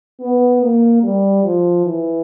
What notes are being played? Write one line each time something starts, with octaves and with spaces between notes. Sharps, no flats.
B3
A#3
G3
F3
E3